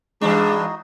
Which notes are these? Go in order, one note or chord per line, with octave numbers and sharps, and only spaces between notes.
G2 E3 G#3 D4 D#4 F#4